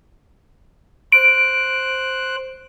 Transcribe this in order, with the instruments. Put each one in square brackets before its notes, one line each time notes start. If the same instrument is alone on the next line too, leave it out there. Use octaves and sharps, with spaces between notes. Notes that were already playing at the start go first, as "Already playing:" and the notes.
[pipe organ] C5 F#6 [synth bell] D7